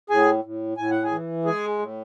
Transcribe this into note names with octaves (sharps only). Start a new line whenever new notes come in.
A2 G#4 G#5
A2
A2 G#5
F#5
G#4 G#5
E3
G#3 G#4 G#5
A2